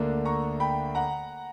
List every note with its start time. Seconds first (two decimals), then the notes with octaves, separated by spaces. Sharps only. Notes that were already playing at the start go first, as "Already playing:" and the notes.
Already playing: D2 D3 A#3 D4
0.25 A#5 C#6
0.60 G5 B5
0.95 F#5 A#5